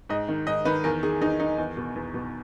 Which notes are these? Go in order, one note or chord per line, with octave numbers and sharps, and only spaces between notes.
G#2 D#5
D#3
G#2 D#5
D#3 B4
E2 A#4
D#3 G#4
E2 D#4
D#3 D#4
E2
B2
E2
B2